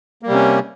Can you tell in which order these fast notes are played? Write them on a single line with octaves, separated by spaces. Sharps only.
A#3 G3 C3 C#4